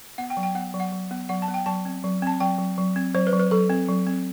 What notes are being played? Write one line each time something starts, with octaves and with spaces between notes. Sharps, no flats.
B3 F#5
G5
F#3
G5
B3 F#5
F#3
F#5
F#3
B3
F#3 F#5
A5
B3
G5
F#3 A5
C4
F#3
C4 A5
F#3 G5
F#3
F#3
C4
F#3 C5
B4
F#3
B4
F#3 A4
C4
F#3
C4